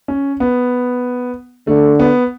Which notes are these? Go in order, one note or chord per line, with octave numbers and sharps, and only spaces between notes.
C#4
B3
D3 A3
B3